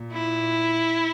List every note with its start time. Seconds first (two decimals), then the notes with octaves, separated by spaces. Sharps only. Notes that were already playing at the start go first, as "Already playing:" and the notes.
Already playing: A#2
0.13 E4